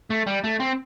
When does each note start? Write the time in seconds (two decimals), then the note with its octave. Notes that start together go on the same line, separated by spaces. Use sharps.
0.10 A3
0.27 G3
0.44 A3
0.60 C4